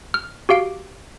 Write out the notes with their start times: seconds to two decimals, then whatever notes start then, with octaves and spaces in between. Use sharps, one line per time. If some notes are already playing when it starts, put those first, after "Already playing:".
0.14 F6
0.49 F#4 G4 F5 D7